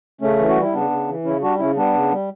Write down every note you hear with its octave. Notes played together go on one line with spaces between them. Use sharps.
C#3 A3 C#4
E3
F#4
G3
E4
C#3 B3 D4
C#3
E3
C#3 C#4 E4
G3 D4 F#4
C#3 C#4 E4
G3 B3 D4
C#3
G3